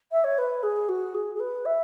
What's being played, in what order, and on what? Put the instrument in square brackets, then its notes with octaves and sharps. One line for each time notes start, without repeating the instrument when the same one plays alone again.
[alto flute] E5
C#5
B4
G#4
F#4
G#4
G#4
B4
E5